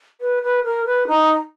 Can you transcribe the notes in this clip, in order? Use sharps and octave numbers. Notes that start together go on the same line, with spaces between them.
B4
B4
A#4
B4
D#4